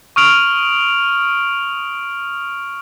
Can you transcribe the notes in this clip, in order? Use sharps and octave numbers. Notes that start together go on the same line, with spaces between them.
C#6 D#6 F6 D7 F7 F#7